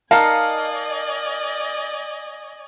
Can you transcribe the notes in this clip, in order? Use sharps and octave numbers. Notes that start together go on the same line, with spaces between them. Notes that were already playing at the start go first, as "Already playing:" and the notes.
D#4 A#4 D5 D#5 F5 G#5 A5 C#7